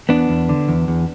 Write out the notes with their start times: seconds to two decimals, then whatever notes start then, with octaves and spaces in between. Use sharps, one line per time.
0.09 E2 B3 D4
0.29 E2
0.49 D3
0.68 E2
0.88 E2